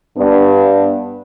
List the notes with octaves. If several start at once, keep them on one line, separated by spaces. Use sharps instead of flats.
G2 B3 D4